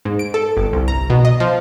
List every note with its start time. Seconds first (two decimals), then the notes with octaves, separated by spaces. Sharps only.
0.05 G#2
0.19 D7
0.34 A4
0.57 G1
0.73 C2
0.88 A#5
1.10 B2
1.25 D#5
1.40 F3